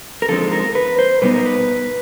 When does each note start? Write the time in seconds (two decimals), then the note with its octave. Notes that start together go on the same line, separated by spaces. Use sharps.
0.22 A#4
0.29 D3 F3 G#3 C4 D#4 A4
0.52 A#4
0.75 B4
0.99 C5
1.21 B2 G3 B3 D#4 B4
1.34 A#4
1.46 B4